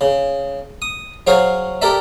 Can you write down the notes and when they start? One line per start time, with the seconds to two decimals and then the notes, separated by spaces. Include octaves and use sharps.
0.01 C#3
0.82 D#6
1.27 F#3 G#4 C5 C#5 F5
1.82 G4 A4 A#4 D5 E5